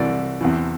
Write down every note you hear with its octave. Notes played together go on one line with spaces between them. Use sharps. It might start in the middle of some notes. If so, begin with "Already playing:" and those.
Already playing: C2 C3 E3 D5
E2 C3 E3